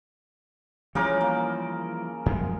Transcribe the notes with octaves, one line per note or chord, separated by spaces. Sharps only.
C#3 E3 F3 G3 A#4 D6
A#3
F#2 F3 G#3